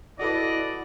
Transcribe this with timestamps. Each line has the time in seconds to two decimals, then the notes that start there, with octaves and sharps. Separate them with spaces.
0.19 E4 F#4 A4 B4 D5 D#5